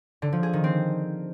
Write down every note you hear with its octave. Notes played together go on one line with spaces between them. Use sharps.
D3
F3
G#4
D#3
C4